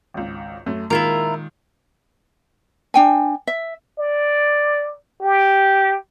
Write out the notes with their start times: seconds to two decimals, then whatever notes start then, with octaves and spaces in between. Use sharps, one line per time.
0.14 G#1 C#2
0.66 F#2 A3
0.90 A#2 D#3 G#3 E4 F4 A#4
2.94 D4 G5 G#5
3.47 E5
3.99 D5
5.22 G4